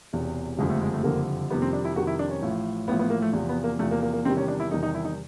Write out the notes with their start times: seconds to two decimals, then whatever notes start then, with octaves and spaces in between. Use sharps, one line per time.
0.13 E1 E2 C3
0.59 F#1 F2 D3 G3 G#3
0.70 A3
0.81 G#3
0.93 A3
1.03 F#1 F2 D3 G3 A#3
1.50 F2 C3 D#3 G3 B3
1.62 C4
1.73 D4
1.85 E4
1.96 F2 C3 D#3 G3 F#4
2.07 E4
2.19 D4
2.30 C#4
2.42 A1 A2 F3
2.88 A1 A2 F3 B3
2.99 B3
3.10 A#3
3.22 A3
3.33 E2 C3 F3
3.49 B3
3.64 A#3
3.79 E2 C3 F3 A3
3.91 A#3
4.02 A#3
4.13 A#3
4.25 E2 C3 D#3 G3 C4
4.37 C#4
4.48 D4
4.60 E4
4.71 E2 C3 D#3 G3 D#4
4.83 D#4
4.95 E4
5.05 D#4